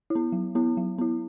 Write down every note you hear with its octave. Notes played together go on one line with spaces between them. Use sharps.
E4
B3
F#3
B3 E4
F#3
B3 E4